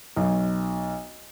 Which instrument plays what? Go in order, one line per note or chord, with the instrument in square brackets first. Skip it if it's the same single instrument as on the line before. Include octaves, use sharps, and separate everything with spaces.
[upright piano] B1